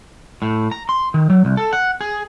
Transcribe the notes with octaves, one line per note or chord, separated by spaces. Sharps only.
A2
A#5
C6
D#3
F#3
C2
A4
F#5
G#4